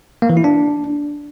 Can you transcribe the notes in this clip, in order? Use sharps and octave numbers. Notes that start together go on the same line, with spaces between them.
A#3
E3
E4
D4